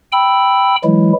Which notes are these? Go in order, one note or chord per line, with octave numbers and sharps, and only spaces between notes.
G5 B5 E6
E3 F#3 G#3 E4